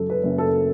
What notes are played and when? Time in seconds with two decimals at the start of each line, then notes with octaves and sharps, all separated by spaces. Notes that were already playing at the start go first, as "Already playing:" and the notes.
Already playing: F#2 C#3 A4
0.10 B4
0.23 F#1
0.38 A4